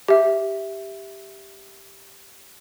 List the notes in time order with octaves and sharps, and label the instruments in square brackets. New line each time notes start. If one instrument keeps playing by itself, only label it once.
[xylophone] G4 E5